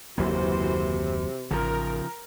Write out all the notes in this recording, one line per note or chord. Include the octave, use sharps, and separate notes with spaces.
F#1 D#2 C3 E3 F#3 A#3 F#4 C5
A1 C#3 F3 A#4